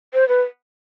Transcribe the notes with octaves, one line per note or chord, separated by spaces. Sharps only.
C5
B4